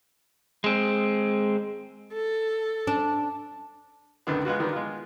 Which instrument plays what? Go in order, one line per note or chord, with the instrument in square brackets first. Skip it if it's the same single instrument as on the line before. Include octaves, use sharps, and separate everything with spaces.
[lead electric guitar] G#3 C4
[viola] A4
[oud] D4
[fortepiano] C#2 F#2 D3 D#3 B3
G#3 B3 F4 F#4
D3 D#3 G3 B3
G#3 F4